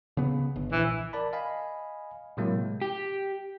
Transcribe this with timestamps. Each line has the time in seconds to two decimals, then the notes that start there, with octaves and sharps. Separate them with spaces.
0.17 C#3 B3
0.56 G1
0.72 A#1 E3
1.13 A#4 D5 A5 B5
1.33 D#5 F5 G#5 B5
2.37 A2 C3 F#3 G#3 A#3 E4
2.81 G4